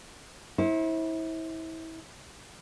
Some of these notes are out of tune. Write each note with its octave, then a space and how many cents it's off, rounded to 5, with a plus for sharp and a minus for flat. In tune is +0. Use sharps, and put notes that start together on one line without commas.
E4 -30 C5 +35